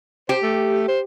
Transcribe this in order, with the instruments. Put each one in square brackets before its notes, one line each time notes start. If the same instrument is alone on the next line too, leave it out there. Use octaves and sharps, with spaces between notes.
[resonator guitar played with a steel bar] G4 [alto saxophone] C5
[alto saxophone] A3
C5